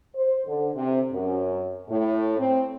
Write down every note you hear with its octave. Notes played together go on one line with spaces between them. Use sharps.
C5
D3
C3
F#2
A2
C4